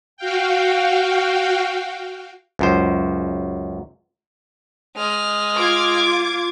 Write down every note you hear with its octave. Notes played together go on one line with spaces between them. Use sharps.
F#4 F5 G5
C#2 F#2 C5
G#3 F6
F4 D6 G#6